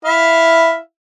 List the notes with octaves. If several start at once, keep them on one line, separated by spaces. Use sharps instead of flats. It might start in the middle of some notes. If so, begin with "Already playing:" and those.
E4 E5 F5